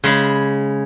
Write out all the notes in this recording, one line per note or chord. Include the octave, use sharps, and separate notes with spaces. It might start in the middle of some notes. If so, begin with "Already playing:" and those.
C#3 G#3 B5